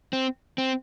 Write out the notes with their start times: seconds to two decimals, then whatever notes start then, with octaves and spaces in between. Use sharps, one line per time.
0.13 C4
0.58 C4